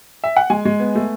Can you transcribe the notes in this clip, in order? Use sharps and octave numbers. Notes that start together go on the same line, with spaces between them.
E5
F#5
G#3 G#5
G#3
B3
A3